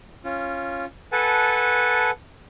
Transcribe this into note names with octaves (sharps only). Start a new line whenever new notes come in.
C#4 F4
A4 B4 F#5 G#5 A5